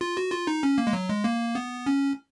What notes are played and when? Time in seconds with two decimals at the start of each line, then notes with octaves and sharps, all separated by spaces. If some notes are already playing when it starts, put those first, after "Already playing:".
0.01 F4
0.17 F#4
0.31 F4
0.47 D#4
0.63 C#4
0.78 A#3
0.87 G#3
0.93 F#3
1.09 G#3
1.24 A#3
1.55 B3
1.86 C#4